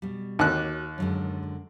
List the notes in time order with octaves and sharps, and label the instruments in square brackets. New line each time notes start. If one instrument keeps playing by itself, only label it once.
[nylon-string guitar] B2 G3
[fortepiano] D#2 F#6 [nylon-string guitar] F#4 C#5 F#5
[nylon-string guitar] F#2 D3 G#3